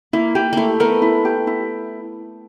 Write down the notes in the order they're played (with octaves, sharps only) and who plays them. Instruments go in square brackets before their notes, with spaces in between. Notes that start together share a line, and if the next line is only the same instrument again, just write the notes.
[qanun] A#3 [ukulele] E4
[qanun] A#3 [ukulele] G4
[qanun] A3 A#3 [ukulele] E4
[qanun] A3 B3 [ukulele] A#4
[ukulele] E4
G4
E4